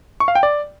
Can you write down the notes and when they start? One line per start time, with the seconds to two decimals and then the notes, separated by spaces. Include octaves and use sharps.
0.20 C#6
0.28 F5
0.35 G5
0.43 D5